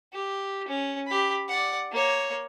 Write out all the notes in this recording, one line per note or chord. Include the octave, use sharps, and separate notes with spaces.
G4
C#4
G4 B5
D5 F#5
A#3 C#5